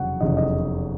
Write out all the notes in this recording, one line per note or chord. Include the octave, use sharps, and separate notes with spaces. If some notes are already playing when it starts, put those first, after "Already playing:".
Already playing: F1 E2 C#3 F#3 F#5
F1 E2 C#3 F#3 D#5
D#5